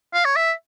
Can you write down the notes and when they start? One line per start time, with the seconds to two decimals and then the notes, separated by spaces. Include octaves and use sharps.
0.13 F5
0.25 C#5
0.36 E5